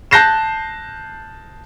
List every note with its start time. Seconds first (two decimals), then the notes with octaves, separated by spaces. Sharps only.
0.11 A5 F#6 G6 A#6 C7 E7